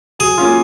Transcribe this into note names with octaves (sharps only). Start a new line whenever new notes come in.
F#3 G#4
A#3 C#4 F4